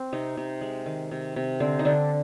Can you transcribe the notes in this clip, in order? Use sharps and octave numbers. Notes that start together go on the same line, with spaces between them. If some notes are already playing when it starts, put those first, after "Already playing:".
Already playing: C4
C3 D#4
C3
G#3
D#3
C3
C3
D3 C4
D#4
D3 D4